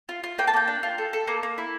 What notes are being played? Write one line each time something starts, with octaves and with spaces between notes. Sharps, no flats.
F4
F4
A#3 G5
A5
A#3 G5
D4
F4
A4
A4
A#3
A#3
E4